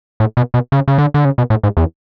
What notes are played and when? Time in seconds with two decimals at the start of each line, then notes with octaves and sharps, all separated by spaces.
0.20 A2
0.37 B2
0.54 B2
0.72 C#3
0.88 C#3
0.98 D3
1.14 D3
1.25 C#3
1.38 B2
1.50 A2
1.63 G#2
1.77 E2